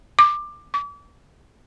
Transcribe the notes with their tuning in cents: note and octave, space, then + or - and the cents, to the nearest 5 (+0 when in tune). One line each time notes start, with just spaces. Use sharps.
D6 +20
D6 -40